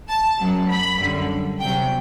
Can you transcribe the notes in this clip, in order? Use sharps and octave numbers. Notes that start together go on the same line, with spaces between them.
A5
F#2 F#3
B5
F#2 D3 G3
E2 C3 F#3 G5